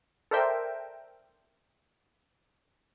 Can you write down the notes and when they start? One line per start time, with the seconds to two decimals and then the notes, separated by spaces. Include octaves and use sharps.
0.31 A4 A#4 C5 D5 E5 G5